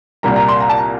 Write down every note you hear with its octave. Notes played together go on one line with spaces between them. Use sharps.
C2 A#2 G3 A#3 A#5
A#5
C6
A#5
A5
A#5